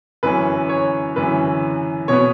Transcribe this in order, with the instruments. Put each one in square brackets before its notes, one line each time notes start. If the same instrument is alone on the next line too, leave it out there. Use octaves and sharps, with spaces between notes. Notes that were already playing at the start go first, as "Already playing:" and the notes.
[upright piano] F#2 E3 C#4 B4
C#5
F#2 E3 C#4 B4
B2 B3 C#5